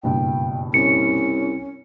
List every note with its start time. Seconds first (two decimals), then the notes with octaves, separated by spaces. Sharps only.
0.04 F#1 G2 B2 G5
0.74 C2 C#4 C#7